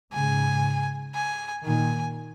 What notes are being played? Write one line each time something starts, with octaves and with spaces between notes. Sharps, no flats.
G#2 C#3 G#5
G#5
A#2 D#3 G#5